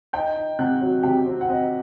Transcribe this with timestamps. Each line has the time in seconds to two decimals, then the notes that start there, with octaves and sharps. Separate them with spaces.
0.13 D#4 G5 G6
0.36 D#4
0.59 C3 F#5 F#6
0.81 F#3
1.03 C3 G4 G5
1.26 C4
1.41 F#5
1.49 C4 D#5